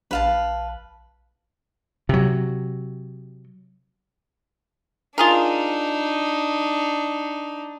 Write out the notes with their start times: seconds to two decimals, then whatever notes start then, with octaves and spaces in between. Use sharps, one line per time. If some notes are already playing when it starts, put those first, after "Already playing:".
0.11 A#1 B4 F5 A5
2.09 C3 F#3
5.18 D4 D#4 F4 G#4 A#4